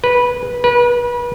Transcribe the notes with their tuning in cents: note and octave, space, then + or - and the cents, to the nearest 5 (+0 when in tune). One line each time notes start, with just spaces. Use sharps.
B4 -10
B4 -30